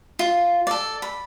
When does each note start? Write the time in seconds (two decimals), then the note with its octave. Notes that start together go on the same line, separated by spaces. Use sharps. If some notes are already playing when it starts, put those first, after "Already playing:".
0.19 F4
0.67 A4 D5
1.02 B5